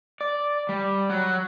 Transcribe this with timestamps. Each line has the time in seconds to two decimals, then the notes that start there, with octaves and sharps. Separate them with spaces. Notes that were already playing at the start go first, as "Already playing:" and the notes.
0.21 D5
0.69 G3
1.10 F#3